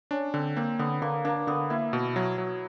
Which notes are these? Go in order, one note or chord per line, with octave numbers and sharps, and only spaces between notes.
C#4 D4
D3 C4
A#3 C4
D3 B3
D3 A#3
A#3 D4
D3 B3
A#3 E4
B2
F#3
F#3